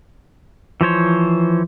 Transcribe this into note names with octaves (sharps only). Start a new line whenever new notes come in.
E3 F3 C5 C#5